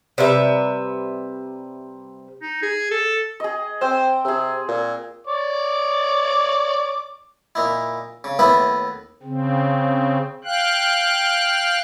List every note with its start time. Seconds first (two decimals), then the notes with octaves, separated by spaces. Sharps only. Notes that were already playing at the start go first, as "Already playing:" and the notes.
0.18 C3 G3 B4 E5
2.42 D#4
2.62 G#4
2.91 A4
3.40 G#4 D#5
3.81 C4 C5 G5
4.25 C3 G#4 E6
4.68 A#2
5.27 C#5 D5 D6
7.55 A#2 D#4 E4
8.24 C#3
8.39 D#2 A2 B3 E4 B4 B5
9.23 C#3 C4
10.44 F5 G5 F#6